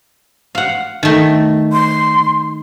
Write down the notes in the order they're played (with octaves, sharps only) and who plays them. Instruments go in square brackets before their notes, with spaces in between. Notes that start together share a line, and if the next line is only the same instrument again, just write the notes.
[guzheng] F5 F#5
D#3 A3
[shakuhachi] C6